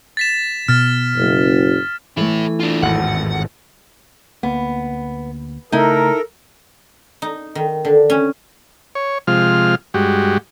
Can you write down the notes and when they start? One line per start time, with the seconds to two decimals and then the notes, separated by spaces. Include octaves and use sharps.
0.17 A6 B6 E7
0.68 B2 F6 A6
1.15 F#1
2.17 E3 A3 E4 A4
2.60 D4 F4
2.83 G#1 E2 A2 F#5
4.43 D2 A#3 B3
5.72 C#3 A3 D#4 E4 A4 A#4
7.22 D#4
7.55 D#3
7.85 D3
8.10 C#4
8.95 C#5
9.27 C3 F3 G#3 F4 F6
9.94 G2 G#3 F#4 G4